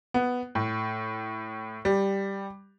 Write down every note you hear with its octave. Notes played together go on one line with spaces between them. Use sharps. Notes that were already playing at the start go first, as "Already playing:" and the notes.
B3
A2
G3